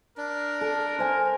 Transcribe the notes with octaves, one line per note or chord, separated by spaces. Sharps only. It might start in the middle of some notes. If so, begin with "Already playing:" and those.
D4 A#4
A4
C5 G#5 A#5